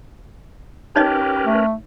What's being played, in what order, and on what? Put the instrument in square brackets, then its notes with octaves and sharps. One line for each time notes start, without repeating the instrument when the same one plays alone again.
[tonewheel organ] C#4 A#4 B4 [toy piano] D#4 C#5 D#5 [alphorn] G4
[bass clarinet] A3